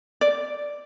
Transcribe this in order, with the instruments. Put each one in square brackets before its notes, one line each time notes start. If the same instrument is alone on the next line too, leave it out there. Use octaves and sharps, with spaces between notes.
[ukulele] D5